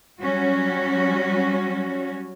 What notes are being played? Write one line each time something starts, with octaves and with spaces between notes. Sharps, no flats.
F#3 G3 C#4 F#4